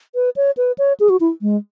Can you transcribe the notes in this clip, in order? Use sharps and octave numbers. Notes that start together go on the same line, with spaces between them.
B4
C#5
B4
C#5
G#4
F#4
E4
G#3